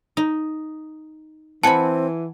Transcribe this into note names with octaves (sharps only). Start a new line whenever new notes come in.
D#4
E3 C4 F#5 G#5 A5 B5 C#7